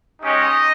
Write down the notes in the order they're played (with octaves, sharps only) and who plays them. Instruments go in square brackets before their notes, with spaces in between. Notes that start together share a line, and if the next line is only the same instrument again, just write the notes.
[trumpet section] G#3 C#4 D#4 G4 D#5